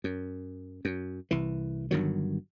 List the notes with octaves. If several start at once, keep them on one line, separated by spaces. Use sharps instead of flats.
F#2
F#2
C2 E3
G1 G2 D#3 F#3